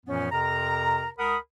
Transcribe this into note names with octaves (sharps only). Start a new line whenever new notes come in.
F#2 A#2 E3 F3 B3 C#4
F2 C3 A#4 A#5
C#2 A#4 F#5 B5 D#6